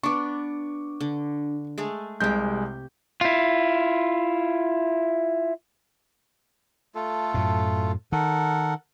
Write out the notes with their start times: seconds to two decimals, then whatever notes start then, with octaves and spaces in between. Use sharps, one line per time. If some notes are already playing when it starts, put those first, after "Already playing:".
0.03 B3 D4 C#6 D6
1.00 D3
1.78 G#3 A3 G#4
2.20 C2 C3 G#3 G4 G6
3.21 E4 F4
6.95 A3 F4 A4
7.34 F#2 A2
8.12 D#3 A4 A#4 F#5